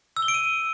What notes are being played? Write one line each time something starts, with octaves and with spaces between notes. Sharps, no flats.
E6
G7
D7
D#7